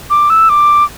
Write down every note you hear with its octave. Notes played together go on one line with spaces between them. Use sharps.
D6
E6
D6